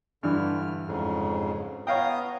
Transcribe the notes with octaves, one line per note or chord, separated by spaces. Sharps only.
G2 D3 E3 F6
F2 G#2 C#3
B3 C#5 F5 G5 A#5 D#6